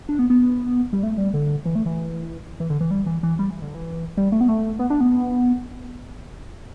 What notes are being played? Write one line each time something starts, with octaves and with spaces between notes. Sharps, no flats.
D4
B3
B3
G3
A3
G3
D3
E3
A3
E3
E3
D3
E3
G3
E3
E3
G3
E3
D3
E3
G3
A3
B3
A3
B3
D4
B3